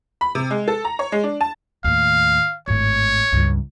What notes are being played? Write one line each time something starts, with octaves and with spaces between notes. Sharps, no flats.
B5
C3
G#3
A4
A#5
C#5
G#3
D4
A5
D#2 A2 F5
G#1 A2 C#5
C#2 G2